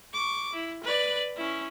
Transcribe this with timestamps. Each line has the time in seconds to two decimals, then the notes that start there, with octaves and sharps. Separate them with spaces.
0.13 C#6 D6
0.53 E4
0.84 B4 D5
1.37 C#4 E4